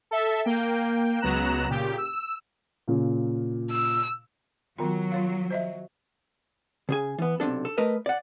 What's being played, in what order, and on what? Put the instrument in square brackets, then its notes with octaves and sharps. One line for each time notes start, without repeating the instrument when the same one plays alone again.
[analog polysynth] A4 E5
A#3 G5
C#2 F#3 B3 A#5 F#6 E7
A#2 C#3 G4
E6
[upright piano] A#2 C#3
[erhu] E6
[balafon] D#3 B3 F4 [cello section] F#3
[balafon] F4 C#5 F5
C5 D#5 E5
[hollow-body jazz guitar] C#3 G#4 G#5
E3 B3
B1 C3 F3 D4 A4
A4
A3 A#4 B4 D#5
D5 F#5